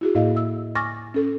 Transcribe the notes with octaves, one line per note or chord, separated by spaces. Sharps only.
E4 F#4 G#4
A2 A#3 E4 D#5 F5
E5 E6
G#5 C#6 D6 F6 A6 A#6
C#4 A4